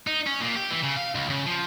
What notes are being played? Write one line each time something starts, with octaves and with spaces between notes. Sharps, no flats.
D#4
C#4
A#2
G4
E3
C#3
F5
C#2
C#3
F3